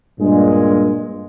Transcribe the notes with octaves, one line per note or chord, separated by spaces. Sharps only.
G2 A#2 G#3